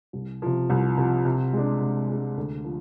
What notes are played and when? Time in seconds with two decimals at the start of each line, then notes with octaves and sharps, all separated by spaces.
0.13 C2
0.42 C3 F3
0.70 C2
0.97 C3 F3
1.25 C3
1.53 G#3 D4
1.81 C3
2.09 G#3 D4
2.37 D2
2.64 F3